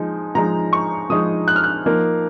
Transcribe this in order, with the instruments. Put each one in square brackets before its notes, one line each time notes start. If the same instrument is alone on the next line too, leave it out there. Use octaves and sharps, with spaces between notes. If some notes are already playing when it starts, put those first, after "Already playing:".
Already playing: [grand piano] F3 G#3 D#4
F3 G#3 D#4 A#5
C#6
F3 G#3 D#4 D#6
F#6
F6
F#6
F3 A#3 D#4